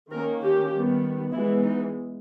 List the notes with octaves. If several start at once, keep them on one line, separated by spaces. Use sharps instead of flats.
D#3 A#3 C#4 A#4
G4
D#3 G3 B3
E3 G#3 B3 E4
D#4